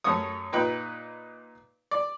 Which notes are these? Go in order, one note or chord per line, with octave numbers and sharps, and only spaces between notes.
F#2 A3 C#4 C#5 D#6
A#2 D#4 B4 G5 B5
D5